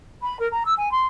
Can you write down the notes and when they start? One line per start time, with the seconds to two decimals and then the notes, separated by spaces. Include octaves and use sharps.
0.21 B5
0.38 A#4
0.52 A#5
0.65 E6
0.77 G#5
0.91 C6